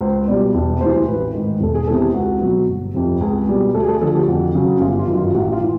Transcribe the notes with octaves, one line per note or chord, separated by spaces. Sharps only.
C#2 C5
B2 G3 D5
E1
D2 C3 E3 C5
A1 B4
G#2 D#3
E1 A4
G#4
E2 C3 A4
G4
C#2 F#4
B2 F#3
G1
F2 C3
C#2 G#4
B2 G3
D2 A4
G#4
A4
D3 F3 A4
G4
F2 F#4
C#3 F#3
G1 F4
F4
F#2 D#3
F4
A1 F#4
F4
E3